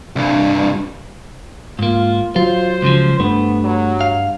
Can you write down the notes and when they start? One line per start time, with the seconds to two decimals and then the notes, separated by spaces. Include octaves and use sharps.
0.16 C2 G2
1.79 G#2 A#3 F4
2.36 F#3 F4 C5
2.82 C#2 C#3 F3
3.20 G2 A3 B3
3.64 F#3
4.01 F5